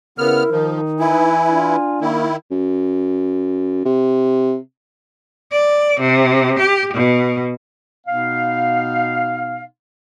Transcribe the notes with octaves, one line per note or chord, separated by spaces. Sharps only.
C#3 B3 E4 A#4 F6
D#3 F3 D#4
E3 E4 G#5
D4 F4
D#3 A#3 E4
F#2
C3
D5
C3
G4
B2
B2 B3 D#4 F5